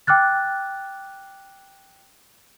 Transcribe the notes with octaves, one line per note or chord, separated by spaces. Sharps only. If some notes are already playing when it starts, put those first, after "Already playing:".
G5 D6 F6 F#6 A6